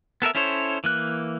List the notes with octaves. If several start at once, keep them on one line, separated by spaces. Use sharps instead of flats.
B3 A4 A#4 E5
C#4 E4 A4 C5 C#5
E3 A#3 F#6